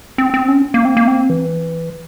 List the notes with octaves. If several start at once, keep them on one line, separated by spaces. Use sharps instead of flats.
C4
C4
C#4
A#3
C4
A#3
C4
E3